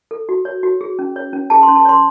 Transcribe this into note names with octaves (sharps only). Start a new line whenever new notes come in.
A4
F#4
C#5
F#4
G#4
C#4
C#5
C#4
G#4 A5
C6
C#4
A5
C#5 C6